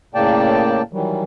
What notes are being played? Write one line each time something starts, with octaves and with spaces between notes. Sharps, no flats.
A2 C#3 A#3 D5 G5 A5
D#3 E3 F#3 G3